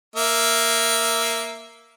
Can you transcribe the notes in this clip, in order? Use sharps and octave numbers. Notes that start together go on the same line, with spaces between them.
A#3 E5